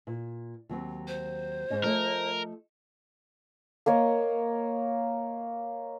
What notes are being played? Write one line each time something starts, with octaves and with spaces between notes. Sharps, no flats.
A#2
D#2 F#3 C4
C5
G#2 C#4 D#5
F3 A3 A#4 D#5
A#3 A#4 C#5 D#5